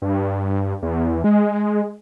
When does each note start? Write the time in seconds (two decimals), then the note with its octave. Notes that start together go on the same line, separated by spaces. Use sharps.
0.02 G2
0.82 E2
1.24 G#3